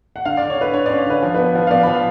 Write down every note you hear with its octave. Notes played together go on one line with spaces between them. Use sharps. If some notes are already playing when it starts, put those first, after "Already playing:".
F#5
D3 F5
D3 D5
C#5
D3 B4
D3 C#5
C#4 D5
C#5
D3 B4
F3
B3 B4
F3
F5
B3 D5
F3 B5